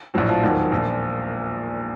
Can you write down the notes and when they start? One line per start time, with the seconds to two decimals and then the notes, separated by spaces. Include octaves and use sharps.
0.14 A#1 A2 F3 F#3 F#4
0.28 F3 F4
0.43 E1 D#2 D#3 F#3
0.72 A#1 A#2 F3